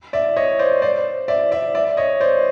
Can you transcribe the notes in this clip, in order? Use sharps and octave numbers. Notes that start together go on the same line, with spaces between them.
D5 E5
C#5 D#5
C5 D5
C5 D5
D5 E5
D5 E5
D5 E5
C#5 D#5
C5 D5